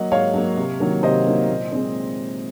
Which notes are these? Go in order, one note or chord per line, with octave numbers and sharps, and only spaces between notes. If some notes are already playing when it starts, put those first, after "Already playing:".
Already playing: F#3 A#3 D#5 F#5
G#2 C#5 F5
F#3 A#3
C3
D#3 F#3 A#3
C3 C5 D#5
D#3 F#3 A#3
A#2
G#3 C4